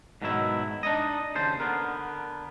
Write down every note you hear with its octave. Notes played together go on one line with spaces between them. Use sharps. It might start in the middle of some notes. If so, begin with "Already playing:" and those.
G#2 B2 D#3 F#3 E4
D4 D#4 D#5
D#2 C#3 C5 A5
D3 B3 A#4